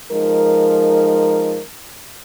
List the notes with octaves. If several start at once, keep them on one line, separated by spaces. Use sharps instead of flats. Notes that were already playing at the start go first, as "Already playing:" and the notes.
F3 G#3 D#4 A#4